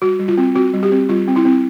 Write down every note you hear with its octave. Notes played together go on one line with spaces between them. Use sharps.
G3 F#4
G3
F4
C4
C4 F#4
G3
G4
C4
G3 F4
C4
E4
C4